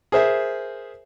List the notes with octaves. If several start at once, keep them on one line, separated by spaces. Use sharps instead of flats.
G#4 A#4 C5 E5